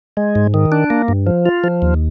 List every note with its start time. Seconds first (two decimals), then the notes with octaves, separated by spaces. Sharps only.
0.17 G#3
0.35 G#2
0.54 D#3
0.72 D4
0.90 A#3
1.08 G2
1.27 F3
1.46 F4
1.64 F3
1.82 D#2